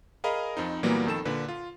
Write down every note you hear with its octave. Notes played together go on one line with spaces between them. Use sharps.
G#4 A#4 D#5 F5 A#5 B5
F2 C4 D#4
A#2 E3 F#3 G3 A#3 B3
F2 D#3 A4 E7
A#2 D3 B4
F4